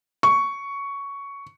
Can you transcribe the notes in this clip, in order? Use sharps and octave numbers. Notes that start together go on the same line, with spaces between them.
C#6